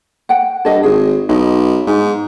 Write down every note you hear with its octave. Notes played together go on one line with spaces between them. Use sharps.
F#5 G5
G2 A4 D#5
G#1 G#4
B1 D#4
G#2